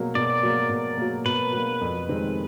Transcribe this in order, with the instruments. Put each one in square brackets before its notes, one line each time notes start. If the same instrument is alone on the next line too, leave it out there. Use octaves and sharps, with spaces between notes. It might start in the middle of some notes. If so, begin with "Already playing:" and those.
Already playing: [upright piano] B2 F#3 A#3
[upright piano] B2 [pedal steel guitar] D5
[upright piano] F#3 A#3
B2
F#3 A#3
[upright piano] B2 [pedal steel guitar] B4
[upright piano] F#3 A#3
F2
C3 D#3 G#3 C4